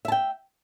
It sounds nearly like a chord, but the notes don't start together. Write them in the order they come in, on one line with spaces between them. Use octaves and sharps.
E5 A5 G5